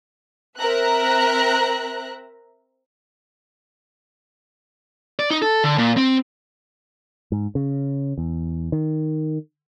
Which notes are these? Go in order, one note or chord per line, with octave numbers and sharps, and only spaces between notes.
C4 A#4 E5 A#5 F#6
D5
D#4
A4
D3
A#2
C4
G#2
C#3
E2
D#3